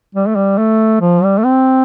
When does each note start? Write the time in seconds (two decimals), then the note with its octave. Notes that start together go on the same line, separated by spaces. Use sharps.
0.15 G3
0.28 A3
0.36 G3
0.58 A3
1.01 F3
1.23 G3
1.39 A3
1.44 C4